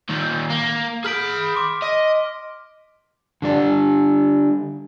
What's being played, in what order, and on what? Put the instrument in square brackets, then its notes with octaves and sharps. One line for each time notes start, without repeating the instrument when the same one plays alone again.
[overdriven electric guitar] A#2 D#3
A#3
[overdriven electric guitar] G#4 B5 [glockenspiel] F6 B6 D7
[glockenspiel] C6 D6
[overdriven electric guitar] D#5
[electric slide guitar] D3 G3 D4